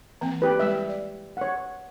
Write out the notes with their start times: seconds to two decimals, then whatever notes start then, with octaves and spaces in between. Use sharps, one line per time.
0.21 E3 A#3 C4
0.42 G4 B4
0.60 G3 G#3 E5
0.89 D5
1.37 C#5 F#5